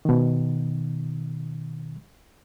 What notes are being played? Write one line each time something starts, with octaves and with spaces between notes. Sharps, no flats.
B2 D#3